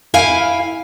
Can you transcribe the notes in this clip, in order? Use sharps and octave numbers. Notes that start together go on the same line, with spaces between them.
E4 E5 F5 G5 G#5